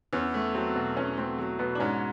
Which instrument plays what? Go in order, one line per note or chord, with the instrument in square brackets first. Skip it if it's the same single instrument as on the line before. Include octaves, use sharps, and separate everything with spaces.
[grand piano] E2 [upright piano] C#4
[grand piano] A3
[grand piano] F#3 [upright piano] C4
[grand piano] B2
[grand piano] E2 [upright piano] C#4
[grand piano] A3 [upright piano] C4
[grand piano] F#3
[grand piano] B2 [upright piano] B3
[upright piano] D4
[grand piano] G#2 [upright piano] C#4